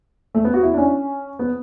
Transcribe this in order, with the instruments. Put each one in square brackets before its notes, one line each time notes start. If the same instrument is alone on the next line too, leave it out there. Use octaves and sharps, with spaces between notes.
[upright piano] A3
B3
F#4
E4
D4
C#4
B3